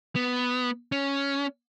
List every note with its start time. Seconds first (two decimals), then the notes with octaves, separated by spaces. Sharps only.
0.16 B3
0.92 C#4